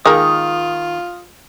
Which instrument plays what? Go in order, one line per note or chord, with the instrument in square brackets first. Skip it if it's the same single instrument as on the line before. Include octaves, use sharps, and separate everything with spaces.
[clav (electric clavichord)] D#3 [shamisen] G#3 A#3 [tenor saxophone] F4 [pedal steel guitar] D#6